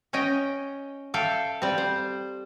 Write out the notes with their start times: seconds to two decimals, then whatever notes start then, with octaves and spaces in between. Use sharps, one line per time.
0.13 C#4 C#5 D#5 G5
1.14 A4 E5 F5 G5
1.62 G3 C4
1.78 C5